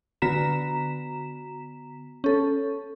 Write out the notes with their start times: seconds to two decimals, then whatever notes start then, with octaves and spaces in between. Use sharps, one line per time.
0.22 D3 B3 F#4 A#5 B6 E7
2.24 C#4 A4